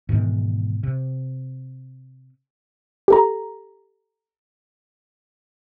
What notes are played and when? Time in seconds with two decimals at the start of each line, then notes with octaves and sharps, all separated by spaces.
0.09 G#2 B2 D#3 E3
0.83 C3
3.08 G4 A4 A#5